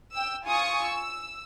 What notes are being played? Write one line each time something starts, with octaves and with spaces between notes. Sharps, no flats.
G5 E6
F4 G#5 C#6 D#6
E6